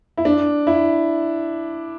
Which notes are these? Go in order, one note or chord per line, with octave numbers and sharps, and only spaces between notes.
E4
D4
E4